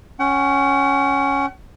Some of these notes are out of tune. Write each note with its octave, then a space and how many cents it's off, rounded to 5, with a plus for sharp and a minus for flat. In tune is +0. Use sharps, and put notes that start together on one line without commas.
C#4 +0 F#5 +40